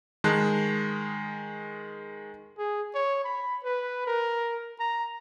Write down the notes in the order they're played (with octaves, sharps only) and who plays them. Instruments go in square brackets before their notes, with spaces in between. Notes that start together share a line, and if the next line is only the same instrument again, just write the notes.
[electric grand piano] D#3 G#3 A5 F#6
[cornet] G#4
C#5
B5
B4
A#4
A#5